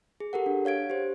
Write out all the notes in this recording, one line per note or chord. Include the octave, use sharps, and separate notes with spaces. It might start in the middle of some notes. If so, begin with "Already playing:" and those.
G#4
G4 A4 A#4 F#5
D4
C#5 F5 G#6 D7
G4 C5